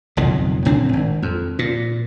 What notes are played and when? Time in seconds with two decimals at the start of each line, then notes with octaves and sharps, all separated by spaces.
0.17 F#1 B1 F2 D#3
0.65 F#1 A2 C4 D4
0.93 G#1
1.22 F2
1.59 A#2